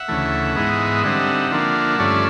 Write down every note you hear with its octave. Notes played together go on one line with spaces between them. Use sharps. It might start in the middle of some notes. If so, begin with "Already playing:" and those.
Already playing: E5 F#5
D2 C#3 E3 A3
G#2 E3 G#3 B3 D#4
D3 G3 C4 D#4 E5 F#5
D3 F3 A#3 D4
G2 D3 F3 A3 C#4 D5 E5